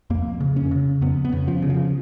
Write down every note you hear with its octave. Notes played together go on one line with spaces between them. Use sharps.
F2 A#3
C#3
C#4
C#3
F2 B3
B3
C#3
F3
C#3
F3